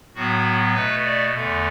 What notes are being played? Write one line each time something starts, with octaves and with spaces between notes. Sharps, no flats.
A2 F#3 B3 F#4
B2 A3 B4
D5
E2 D3 A3